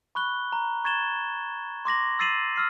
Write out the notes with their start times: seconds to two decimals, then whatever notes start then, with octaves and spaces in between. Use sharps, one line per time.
0.15 B5 C#6 F#6 G7
0.52 A#5
0.84 C#6 G#6 A6 E7 G7
1.85 C6 D6 A#6 F#7
2.19 E6 A6 C7 D#7 E7 F#7
2.56 E6 F6 C7